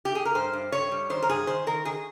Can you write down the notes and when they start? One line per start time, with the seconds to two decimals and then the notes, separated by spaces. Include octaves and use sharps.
0.05 G4
0.15 G#4
0.25 A#4
0.35 G2 C5
0.53 G2
0.72 G2 C#5
0.91 G3
1.10 D#3 C5
1.22 A#4
1.29 G2 G#4
1.47 D#3 C5
1.67 D#3 A#4
1.85 D#3 G#4